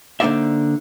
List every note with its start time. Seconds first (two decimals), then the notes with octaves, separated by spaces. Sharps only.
0.20 D3 A#3 D#4 C5 D5 E5